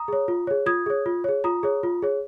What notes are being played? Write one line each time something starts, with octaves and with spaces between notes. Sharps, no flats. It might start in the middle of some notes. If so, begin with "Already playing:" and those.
Already playing: A#5 D#6
G#4 C#5
F4
G#4 C#5
F4 D#6 G#6
G#4 C#5
F4
G#4 C#5
F4 A#5 D#6
G#4 C#5
F4
G#4 C#5